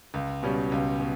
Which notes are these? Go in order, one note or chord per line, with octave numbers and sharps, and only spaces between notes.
C#2
B2 G3 C#4
C#2
B2